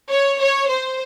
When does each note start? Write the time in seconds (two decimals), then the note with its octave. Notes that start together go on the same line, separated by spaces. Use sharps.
0.11 C#5
0.40 C#5
0.69 C5